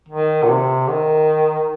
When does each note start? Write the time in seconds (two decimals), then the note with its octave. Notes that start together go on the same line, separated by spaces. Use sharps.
0.09 D#3
0.44 A#2
0.50 C3
0.89 D#3